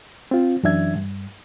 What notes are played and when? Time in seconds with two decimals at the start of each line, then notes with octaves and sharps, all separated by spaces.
0.31 C4 F4
0.63 F#2 E3 D4 E5 G#6
0.95 G2